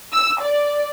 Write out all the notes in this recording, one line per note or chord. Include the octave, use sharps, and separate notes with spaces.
E6
D5